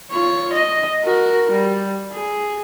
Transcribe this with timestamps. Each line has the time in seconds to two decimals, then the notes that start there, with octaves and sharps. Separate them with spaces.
0.11 F4 C#5
0.53 D#5
1.03 F#4 A#4
1.51 G3
2.12 G#4